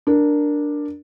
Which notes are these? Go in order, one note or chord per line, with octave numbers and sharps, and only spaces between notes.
D4 A#4